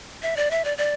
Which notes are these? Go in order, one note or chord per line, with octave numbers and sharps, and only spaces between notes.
E5
D5
E5
D5
D5